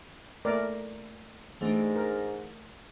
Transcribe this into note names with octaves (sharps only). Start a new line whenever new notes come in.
A3 A#3 A#4 D5
G#2 E3 A3 D4
A#4